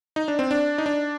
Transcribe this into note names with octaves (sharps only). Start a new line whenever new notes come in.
D#4
D4
C4
D4
D#4
D4